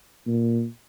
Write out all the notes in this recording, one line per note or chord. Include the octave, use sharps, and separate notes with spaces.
A#2